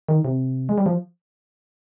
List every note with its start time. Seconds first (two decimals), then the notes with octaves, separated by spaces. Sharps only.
0.09 D#3
0.25 C3
0.69 G#3
0.78 G3
0.86 F3